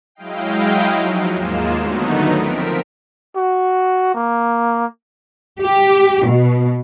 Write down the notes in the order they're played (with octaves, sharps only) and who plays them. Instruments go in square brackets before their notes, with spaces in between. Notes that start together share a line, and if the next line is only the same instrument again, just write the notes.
[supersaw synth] F#3 G#3 E4 D#5 F5 G5
F3 F#3 D#4
D#2 G#2 G#3 A#3 F4 E7
D3 D#3 F#3 A3 B3 D#4
F3 C4 A#4 B6 D7
[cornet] F#4
A#3
[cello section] G4
B2